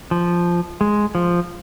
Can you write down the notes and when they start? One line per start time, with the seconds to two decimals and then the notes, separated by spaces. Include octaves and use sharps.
0.11 F3
0.81 G#3
1.15 F3